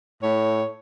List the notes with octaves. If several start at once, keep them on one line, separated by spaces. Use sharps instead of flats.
A2 C#5